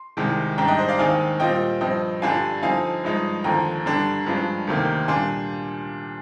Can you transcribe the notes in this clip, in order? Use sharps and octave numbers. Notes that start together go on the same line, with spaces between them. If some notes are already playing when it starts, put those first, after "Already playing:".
Already playing: C6
C2 C3 D#3 G#3
G#2 G3 D4 G5 A#5
D#5 G5
C5 D#5
D5 F5
D#2 D#3 G#3 C4 D#4 F5 G#5
A#2 G3 C4 F4 D#5 G5
G2 F3 C4 D#5 G5
G2 D3 G3 D4 F4 F5 G#5
D3 F3 C4 D#4 F5 G#5
G2 F3 G#3 D#4
D#2 D3 F3 G5 A#5
G2 D3 G3 D4
G2 F3 G#3 D4 F4
D2 C3 D#3 A#3
A#2 G3 D4 F4 G#5 C6